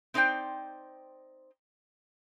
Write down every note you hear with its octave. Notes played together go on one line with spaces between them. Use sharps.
C4 D#4 C5 D5 G5